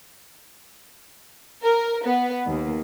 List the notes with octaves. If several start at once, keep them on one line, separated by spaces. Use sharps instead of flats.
A#4
B3
D#2